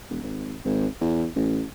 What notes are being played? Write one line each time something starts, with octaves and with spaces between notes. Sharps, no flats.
E1
G#1
G#1
E2
A1